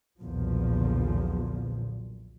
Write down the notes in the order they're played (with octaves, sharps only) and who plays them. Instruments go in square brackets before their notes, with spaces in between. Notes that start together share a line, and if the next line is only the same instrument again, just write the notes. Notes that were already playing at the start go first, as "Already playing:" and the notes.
[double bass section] B1 E2 A#2 D3 F3